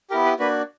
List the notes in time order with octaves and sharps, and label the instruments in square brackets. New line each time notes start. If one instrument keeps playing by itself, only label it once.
[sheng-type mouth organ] B3 E4 G4 A#4
B4
A#3 D4 F#4 B4